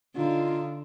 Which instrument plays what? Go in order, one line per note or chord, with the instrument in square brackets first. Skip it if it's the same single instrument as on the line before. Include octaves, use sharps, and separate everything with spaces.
[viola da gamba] D3 [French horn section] D#4 F4